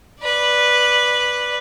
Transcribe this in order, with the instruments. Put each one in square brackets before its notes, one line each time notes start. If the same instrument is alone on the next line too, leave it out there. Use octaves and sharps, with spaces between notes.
[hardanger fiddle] B4 D5